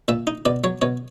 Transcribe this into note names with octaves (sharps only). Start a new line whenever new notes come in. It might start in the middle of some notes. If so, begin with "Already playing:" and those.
A#2 E5
D#4
B2 D5
F#3 C#5
B2 C#5